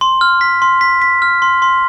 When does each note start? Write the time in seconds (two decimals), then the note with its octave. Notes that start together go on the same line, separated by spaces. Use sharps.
0.01 C6
0.21 F6
0.41 B6
0.62 C6
0.81 B6
1.02 B6
1.22 F6
1.42 C6
1.62 C6